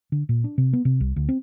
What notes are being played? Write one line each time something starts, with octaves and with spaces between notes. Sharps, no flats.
D3
A#2
D4
C3
B3
C3
C2
D2
C4